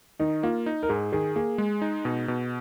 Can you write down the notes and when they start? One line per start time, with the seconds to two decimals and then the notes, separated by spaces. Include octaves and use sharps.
0.19 D#3 D#4
0.43 A#3 F4
0.66 D#4
0.83 A#4
0.89 G#2 G#4
1.13 D#3 G#4
1.36 A#3 G#4
1.58 G#3
1.82 D#4
2.05 B2
2.28 B2